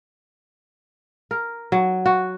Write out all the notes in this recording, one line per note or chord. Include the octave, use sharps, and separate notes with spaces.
A#4
F#3
F#4